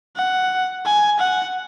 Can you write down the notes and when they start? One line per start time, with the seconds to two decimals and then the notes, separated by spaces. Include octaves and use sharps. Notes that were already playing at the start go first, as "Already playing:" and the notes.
0.16 F#5
0.85 G#5
1.19 F#5